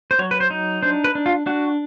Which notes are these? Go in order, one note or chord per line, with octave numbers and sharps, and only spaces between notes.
C5
F#3 C#5
B4
C5
D#4
D4 C5
B4
D4
F4
D4 F#4